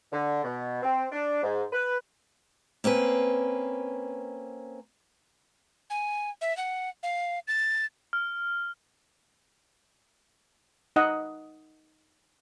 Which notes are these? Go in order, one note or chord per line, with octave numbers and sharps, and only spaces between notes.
D3
B2
C4
D4
G#2
B4
A#3 C4 C#4 B4
G#5
E5
F#5
F5
A6
F6
D#4 D#5 F#5